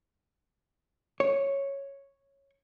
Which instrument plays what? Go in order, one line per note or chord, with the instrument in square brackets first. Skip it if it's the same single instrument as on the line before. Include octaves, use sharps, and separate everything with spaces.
[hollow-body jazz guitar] C#5